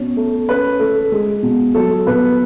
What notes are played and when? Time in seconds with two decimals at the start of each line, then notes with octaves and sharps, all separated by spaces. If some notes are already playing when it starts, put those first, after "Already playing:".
Already playing: B2 C#4
0.17 A3
0.49 C#4 B4
0.80 A3 A4
1.12 G#3
1.43 B2
1.74 F#3 A4
2.07 B2 B4